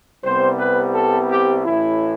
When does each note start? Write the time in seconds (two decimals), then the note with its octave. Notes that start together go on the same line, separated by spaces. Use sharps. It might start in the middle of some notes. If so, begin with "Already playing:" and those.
0.23 C2 C3 G3 B3 C5
0.59 B4
0.93 A4
1.30 G4
1.64 A1 A2 E3 E4